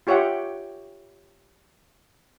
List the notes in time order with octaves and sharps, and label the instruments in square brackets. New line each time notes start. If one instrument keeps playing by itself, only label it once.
[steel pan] F4 G4 C#5 E5 F#5 G5